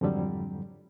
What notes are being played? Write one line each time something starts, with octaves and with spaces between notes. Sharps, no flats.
F2 G#2 D3 F#3 G3